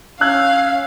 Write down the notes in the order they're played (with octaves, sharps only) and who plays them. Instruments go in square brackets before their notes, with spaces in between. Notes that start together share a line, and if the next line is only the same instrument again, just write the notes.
[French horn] C#4 [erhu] F5 [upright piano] E6 F#6 G#6